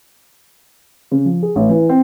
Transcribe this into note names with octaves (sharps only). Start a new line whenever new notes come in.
C#3
F3
G#4
A1
E3
C4